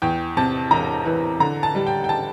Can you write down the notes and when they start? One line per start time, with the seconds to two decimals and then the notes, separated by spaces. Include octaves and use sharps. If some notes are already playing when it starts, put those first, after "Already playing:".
0.02 E2 G5
0.37 C3 A5
0.71 E1 A#5
1.06 E3
1.40 D3 A#5
1.63 A5
1.75 G3
1.87 G5
2.04 G5
2.09 A5